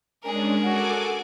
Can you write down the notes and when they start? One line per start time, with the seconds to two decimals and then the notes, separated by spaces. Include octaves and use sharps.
0.23 G#3 C#4 D4 G#4 A#4
0.64 F#4 A4 G#5 D6